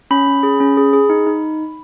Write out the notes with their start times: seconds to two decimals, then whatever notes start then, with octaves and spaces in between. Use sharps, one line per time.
0.11 C#4 B5
0.27 C#4
0.43 G#4
0.60 C#4
0.77 G#4
0.93 G#4
1.10 D#4
1.27 D#4